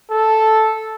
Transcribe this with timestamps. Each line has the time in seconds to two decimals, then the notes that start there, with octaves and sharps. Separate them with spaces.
0.10 A4